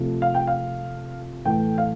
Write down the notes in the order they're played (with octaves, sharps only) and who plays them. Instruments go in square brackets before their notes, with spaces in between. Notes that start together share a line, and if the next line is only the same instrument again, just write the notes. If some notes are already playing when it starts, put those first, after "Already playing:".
Already playing: [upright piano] C3 F3 A3
F5
G5
F5
A2 E3 A3 G5
F5